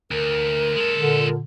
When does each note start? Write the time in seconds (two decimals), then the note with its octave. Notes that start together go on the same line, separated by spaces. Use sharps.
0.11 D2 A#4
0.76 G#3 A4
0.95 A#2 D3